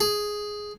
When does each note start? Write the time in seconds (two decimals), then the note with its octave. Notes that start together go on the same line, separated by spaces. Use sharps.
0.01 G#4